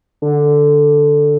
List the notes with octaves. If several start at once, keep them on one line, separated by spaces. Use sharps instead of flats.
D3